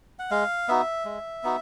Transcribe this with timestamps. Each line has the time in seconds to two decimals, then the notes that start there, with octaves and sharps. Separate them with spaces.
0.19 F#5
0.31 G#3 F5
0.68 B3 D#4 F#4 E5
1.05 G#3
1.43 B3 D#4 F#4